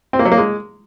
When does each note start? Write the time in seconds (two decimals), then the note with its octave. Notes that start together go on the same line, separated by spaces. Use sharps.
0.13 C4
0.19 A#3
0.25 F#3
0.32 A#3
0.38 G#3